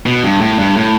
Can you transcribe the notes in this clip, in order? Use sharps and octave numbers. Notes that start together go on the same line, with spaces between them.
B2
G2
A2
G2
A2